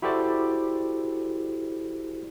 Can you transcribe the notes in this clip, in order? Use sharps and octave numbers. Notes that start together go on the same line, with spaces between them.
E4 F#4 G4 A4 C5 D5